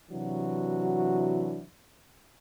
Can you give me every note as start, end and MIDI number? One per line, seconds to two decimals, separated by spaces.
0.11 1.64 48
0.11 1.64 52
0.11 1.64 54
0.11 1.64 62
0.11 1.64 64
0.11 1.64 66